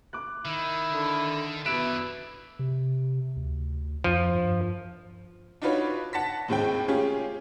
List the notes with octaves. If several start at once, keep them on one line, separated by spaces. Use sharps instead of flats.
D6 F#6
D#3 E4
D3
B2 E4 B4 D5 F#6 D7 E7
C3
D2
F2 F3
G2
D4 D#4 F4 F#4 B4 C#5
F#5 A5 A#6 B6
D#2 A2 G#3 C4 G5
C#4 F4 G4 G#4